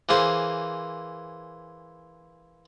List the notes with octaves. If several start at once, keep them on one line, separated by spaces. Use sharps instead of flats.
E3 A#3 G#4 C5